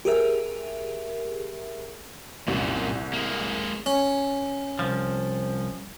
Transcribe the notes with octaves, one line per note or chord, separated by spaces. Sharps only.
G4 G#4 A#4 E5
C2 F#2 A#2
G#3 A#3
C#4
C2 F3